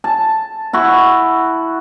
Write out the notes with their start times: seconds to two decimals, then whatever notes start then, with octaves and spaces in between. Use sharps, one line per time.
0.04 A5
0.73 E4 F#4 C#6